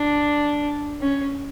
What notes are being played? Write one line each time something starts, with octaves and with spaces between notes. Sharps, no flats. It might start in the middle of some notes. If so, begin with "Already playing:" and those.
Already playing: D4
C#4